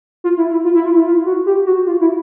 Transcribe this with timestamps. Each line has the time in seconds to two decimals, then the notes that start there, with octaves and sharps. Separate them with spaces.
0.24 F4
0.37 E4
0.51 E4
0.65 F4
0.75 E4
0.85 F4
0.95 E4
1.06 F4
1.26 F#4
1.46 G4
1.66 F#4
1.87 F4
2.01 E4